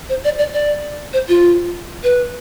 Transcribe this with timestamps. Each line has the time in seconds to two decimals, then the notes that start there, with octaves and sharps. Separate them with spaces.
0.09 C5
0.24 D5
0.39 D5
0.54 D5
1.13 C5
1.29 F4
2.03 B4